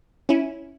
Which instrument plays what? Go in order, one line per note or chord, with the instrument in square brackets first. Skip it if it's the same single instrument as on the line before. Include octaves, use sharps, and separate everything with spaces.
[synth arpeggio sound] C#4 E4